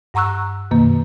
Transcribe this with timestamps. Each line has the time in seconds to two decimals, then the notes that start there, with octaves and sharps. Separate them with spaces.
0.14 G2 F#5 A#5 C#6 E6 F#6
0.71 F#2 B2 D#3 A#3